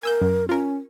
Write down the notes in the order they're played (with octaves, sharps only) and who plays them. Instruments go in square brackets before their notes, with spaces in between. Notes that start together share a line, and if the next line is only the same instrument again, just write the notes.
[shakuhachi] A#4 [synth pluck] G#5 E6 G6
[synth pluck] F#2
[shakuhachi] C#4 [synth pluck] F4 A#4